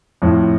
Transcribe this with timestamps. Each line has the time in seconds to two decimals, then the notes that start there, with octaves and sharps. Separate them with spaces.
0.22 F2 A2